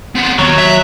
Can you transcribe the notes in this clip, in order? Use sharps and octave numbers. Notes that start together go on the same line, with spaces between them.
B3 C4
D#2 F#3
E5